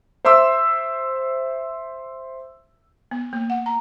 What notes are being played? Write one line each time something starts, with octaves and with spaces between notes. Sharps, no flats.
C5 E5 C6 D6 E6
B3
A#3
F#5
A#5